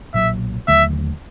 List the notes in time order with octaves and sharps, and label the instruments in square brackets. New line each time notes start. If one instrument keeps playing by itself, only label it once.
[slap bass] B1 A#2 F#3 [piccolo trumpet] E5
[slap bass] D#2 D3 F#3 A3 [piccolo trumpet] E5